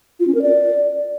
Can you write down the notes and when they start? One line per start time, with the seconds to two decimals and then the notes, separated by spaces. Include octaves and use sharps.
0.20 F4
0.27 C#4
0.35 A#4
0.42 D5